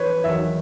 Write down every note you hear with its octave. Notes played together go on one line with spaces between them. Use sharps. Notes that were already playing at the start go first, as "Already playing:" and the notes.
Already playing: E3 B4 C#5
E2 D#3 F#3 E5